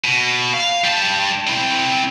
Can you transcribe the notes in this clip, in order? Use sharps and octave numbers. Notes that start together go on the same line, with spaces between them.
B2
F5
G3 A5
C4 E4